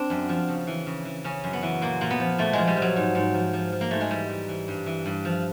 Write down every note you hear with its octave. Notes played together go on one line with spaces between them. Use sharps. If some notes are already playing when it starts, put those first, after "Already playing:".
Already playing: C4 D4
F#2
F3
C#3
E3
C#3
E3
C#3 C#4
F#2
B3
E3
A#2 A#3
A#2 A#3
B3
F3
A#2 A3
F3 G#3
G3
F3 F#3
G#2
G#2
F3
F3
F3
A#3
G#2 A3
G#3
E3 G3
E3
E3
G2
E3
G2
F3